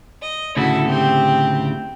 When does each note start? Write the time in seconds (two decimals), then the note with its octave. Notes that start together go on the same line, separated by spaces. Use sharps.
0.23 D#5
0.57 D2 A2 C#3 E4 F#4 A4
0.86 C4 G4